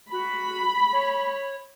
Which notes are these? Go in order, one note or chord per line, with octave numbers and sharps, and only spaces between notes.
F#4 B5
C#5